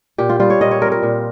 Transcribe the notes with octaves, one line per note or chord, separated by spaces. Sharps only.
A#2 G4
F4
G3 C4 F4
C#5
A#2 D#5
C#5
G3 C4 A#4
A#4
A#2